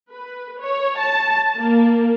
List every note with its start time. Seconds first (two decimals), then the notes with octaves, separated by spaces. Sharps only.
0.11 B4
0.60 C#5
0.98 A5
1.57 A#3